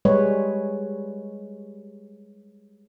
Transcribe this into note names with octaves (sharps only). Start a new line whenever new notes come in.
G3 G#3 B4 C#5